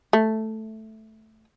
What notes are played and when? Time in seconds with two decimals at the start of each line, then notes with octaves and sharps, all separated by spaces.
0.13 A3